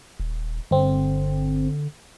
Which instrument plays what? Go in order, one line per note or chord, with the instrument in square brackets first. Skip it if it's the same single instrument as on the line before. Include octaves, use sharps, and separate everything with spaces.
[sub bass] D#1
[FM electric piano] G1 C4 [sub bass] D3